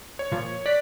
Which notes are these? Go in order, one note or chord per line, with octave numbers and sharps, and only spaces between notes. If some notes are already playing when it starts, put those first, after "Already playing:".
C#5
A#2 F3
D5 F#6 B6